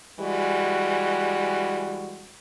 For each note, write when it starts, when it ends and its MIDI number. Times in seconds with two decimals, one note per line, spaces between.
0.20 2.29 52
0.20 2.29 55
0.20 2.29 56
0.20 2.29 66